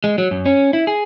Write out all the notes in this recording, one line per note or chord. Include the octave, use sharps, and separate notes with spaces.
G#3
F#3
F#2
C#4
E4
G#4